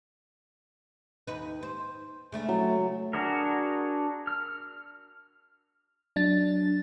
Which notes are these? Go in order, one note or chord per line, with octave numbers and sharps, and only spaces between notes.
D#2 D#4 B4
C5
C#3 A3 D4
F#3
D4 F#4 G#4 A#4
F6
F#3 D4 A6